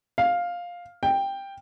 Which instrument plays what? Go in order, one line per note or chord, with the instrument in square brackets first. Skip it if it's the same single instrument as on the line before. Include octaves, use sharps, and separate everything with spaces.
[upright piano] F5
G5